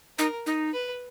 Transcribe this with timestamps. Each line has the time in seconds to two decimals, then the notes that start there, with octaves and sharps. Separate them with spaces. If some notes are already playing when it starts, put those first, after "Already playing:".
0.18 D#4 A#4
0.46 D#4
0.73 B4